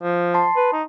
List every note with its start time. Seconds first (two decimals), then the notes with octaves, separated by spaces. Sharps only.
0.03 F3
0.34 A5 C6 C7
0.56 B4
0.73 D#4